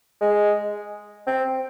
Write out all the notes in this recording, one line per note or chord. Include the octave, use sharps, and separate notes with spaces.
G#3
C4